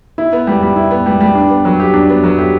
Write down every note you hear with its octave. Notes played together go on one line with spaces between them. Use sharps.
E4
B3
G3
G3
E4
B3
G3
G3
D4
B3
F#3
G4
D4
B3
F#3
G4